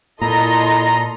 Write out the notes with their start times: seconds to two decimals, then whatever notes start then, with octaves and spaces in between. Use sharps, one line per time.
0.22 A#2 E4 A4 D#5 A#5 C6